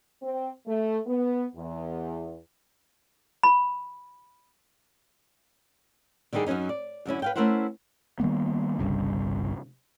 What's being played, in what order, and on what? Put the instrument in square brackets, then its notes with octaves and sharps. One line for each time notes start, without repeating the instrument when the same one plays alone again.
[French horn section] C4
A3
B3
E2
[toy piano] B5
[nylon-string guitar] D3 D#3 G3 D#4 G#4
F#2 F#3 G3 C#4 D#4
D5
F#2 D3 C#4 E4
B4 F5 G5
A3 C#4 E4 A#4 C5 F#5
[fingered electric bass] D#3 G3 A#3 B3
G1 C2 G2 C#3